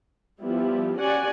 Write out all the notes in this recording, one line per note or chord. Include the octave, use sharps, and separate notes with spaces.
F3 G3 B3 E4 G4
C#4 F#4 G4 D5 F#5 G#5